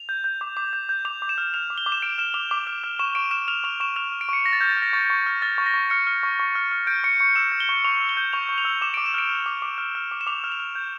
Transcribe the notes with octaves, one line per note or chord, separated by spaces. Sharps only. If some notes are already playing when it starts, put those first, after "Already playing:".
Already playing: F7
G6
G6
D6
D6
G6
G6
D6 F7
D6
E7
F6
F6 F7
D6
G7
D6
E7
F6 D7
F6 E7
D6 F7
D6
F6
F6
C#6 E7
C#6 D7
F6 E7
F6 F7
C#6 F7
C#6 E7
F6 F7
F6
D7
C#6 C#7
C#6 A#6
A6
F6 G6
A6
F6
A#6
C#6 A6
C#6
F6
F6 A6
C#6
A#6
C#6
F6 C#7
F6
C#6
C#6
F6
F6
G6 D7
C#6 C#7
C#6 C#7
E6 E7
G6
G7
C#6
C#6 F7
E6
G7
G6
C#6 F7
C#6
F7
E6
D6 E7
D6 D7
E7
F6 D7
F6
D6
D6
F6
F6
D6
E7
D6 F7
F6
F7
F6
G6